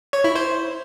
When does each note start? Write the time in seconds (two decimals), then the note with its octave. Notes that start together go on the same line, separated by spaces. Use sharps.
0.13 C#5
0.24 E4
0.35 C5